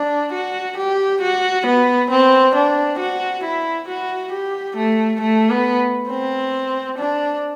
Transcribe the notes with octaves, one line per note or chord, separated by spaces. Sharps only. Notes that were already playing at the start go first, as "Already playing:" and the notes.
Already playing: D4
F#4
G4
F#4
B3
C4
D4
F#4
E4
F#4
G4
A3
A3
B3
C4
D4